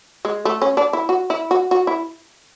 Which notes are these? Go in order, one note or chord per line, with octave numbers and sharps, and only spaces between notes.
G#3
A3
C#4
D4
E4
F#4
E4
F#4
F#4
E4